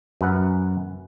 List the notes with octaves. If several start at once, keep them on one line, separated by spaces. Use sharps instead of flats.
F#2 B4 F#5